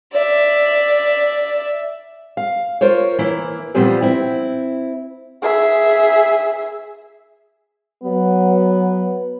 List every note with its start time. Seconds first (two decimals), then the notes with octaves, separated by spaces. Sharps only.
0.12 D5 E5
2.37 F5
2.81 F4 A#4 C5 C#5
3.19 E3 A#3 E4
3.74 A#2 E3 F3 G3 B3 C4
4.02 C4 E4
5.42 G#4 E5
8.03 F#3 B3